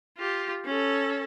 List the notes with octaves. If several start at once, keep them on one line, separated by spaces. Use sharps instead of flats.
F4 G4
C#4 A4